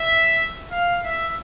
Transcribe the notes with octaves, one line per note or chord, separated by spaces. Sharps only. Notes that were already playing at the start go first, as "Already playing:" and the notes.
Already playing: E5
F5
E5